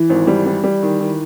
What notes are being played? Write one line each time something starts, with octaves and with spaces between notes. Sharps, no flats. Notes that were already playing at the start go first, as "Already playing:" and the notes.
Already playing: E3
G#1
G3
G3
G3
D#3
D#3